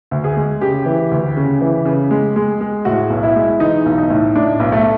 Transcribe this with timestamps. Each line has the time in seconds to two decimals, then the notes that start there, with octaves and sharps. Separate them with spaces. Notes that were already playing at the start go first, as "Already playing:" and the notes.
0.11 D2
0.24 G#4
0.37 G#3
0.61 C#3 G4
0.86 E3
1.11 D2
1.37 C#3
1.61 E3
1.85 C#3
2.11 G#3
2.36 G#3
2.61 G#3
2.85 A2 F#4
3.10 B1
3.23 E4
3.36 G#3
3.60 E3 D#4
3.86 B1
3.98 D#4
4.10 A2
4.35 A2 D4
4.60 B1
4.72 A3